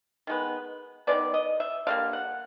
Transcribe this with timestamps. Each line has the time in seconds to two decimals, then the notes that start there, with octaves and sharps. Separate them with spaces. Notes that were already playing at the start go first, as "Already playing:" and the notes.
0.27 D#3 G#3 B3
1.07 D#3 G#3 B3 D5
1.34 D#5
1.60 E5
1.87 D3 G3 A#3 F5
2.13 F#5